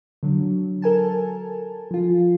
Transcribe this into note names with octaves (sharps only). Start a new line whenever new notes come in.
D3 F#3
A4 A#4 G#5 A5
F3 F4